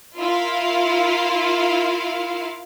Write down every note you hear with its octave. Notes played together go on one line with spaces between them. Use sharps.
E4 F4 A#4 F5